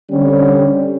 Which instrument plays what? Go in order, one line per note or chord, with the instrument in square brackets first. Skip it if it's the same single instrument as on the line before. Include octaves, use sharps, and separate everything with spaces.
[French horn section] D3 G3 C4 C#4